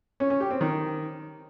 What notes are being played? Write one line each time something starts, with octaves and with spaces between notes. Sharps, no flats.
C#4
C#4
G4
C4
D#3